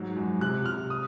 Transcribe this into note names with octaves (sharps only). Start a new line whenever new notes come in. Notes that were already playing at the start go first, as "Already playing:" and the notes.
Already playing: G#2 F#3
F#2
C3 F#6
C3 F6
D#6